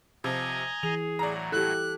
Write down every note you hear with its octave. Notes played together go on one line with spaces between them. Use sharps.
C3 F3 D#5 G#5 A#5
E3 G#4 F7
A2 F#3 D5 A#5
E4 G4 A4 F#6